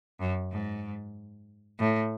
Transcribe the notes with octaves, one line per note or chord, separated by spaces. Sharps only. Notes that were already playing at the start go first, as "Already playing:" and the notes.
F#2
G#2
A2